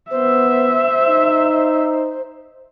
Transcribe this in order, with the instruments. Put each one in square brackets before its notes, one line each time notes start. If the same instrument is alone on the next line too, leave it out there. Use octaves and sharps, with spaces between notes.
[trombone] B3 [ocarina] C5 [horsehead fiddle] E5
[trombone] D#4